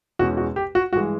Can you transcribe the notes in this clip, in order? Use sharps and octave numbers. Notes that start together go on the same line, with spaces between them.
E2 B2 G#3 C#4 F#4
F#4
G4
F#4
G2 E3 G#3 F#4